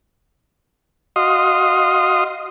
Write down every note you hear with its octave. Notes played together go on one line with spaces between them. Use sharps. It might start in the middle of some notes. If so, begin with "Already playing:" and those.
F#4 D#5 F5 C6 D#6